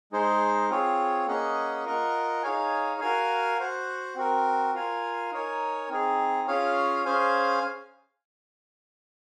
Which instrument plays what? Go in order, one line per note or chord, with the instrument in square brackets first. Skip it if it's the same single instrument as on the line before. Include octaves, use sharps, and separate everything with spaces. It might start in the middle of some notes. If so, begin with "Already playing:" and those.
[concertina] G#3 D#4 G#4 C5
C4 F4 G#4 C#5
A#3 C#4 G#4 D#5 F#5
F4 A#4 D#5 F#5
D#4 G#4 C#5 F5 G#5
F#4 A#4 F5 G#5
F#4 C5 F#5
C4 F#4 A#4
F4 A#4 F5 G#5
D#4 A#4 C#5 G#5
C4 D#4 G#4
C#4 F4 G#4 C#5 F5
C#4 G#4 C5 F5 G#5